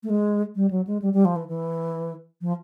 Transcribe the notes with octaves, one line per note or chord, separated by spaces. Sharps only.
A3
G#3
G3
F#3
G#3
G3
G3
F3
E3
E3
F3